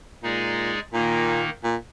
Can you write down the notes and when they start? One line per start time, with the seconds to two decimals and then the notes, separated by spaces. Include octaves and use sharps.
0.23 A#2 G#3 D#4 G#4 D5
0.93 A#2 D#3 A#3 D#4
1.64 A#2